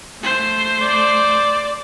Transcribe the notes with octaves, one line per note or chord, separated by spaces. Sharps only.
A3 C5
D5